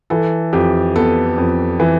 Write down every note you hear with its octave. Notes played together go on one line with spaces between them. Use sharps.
E3 A4
F2 G4
B3 A4
F2
E3